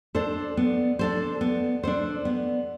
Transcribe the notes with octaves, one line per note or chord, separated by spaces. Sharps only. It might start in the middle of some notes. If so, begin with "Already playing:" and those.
D4 A4 C5
B3
D4 A4 C5
B3
D4 A4 C5
B3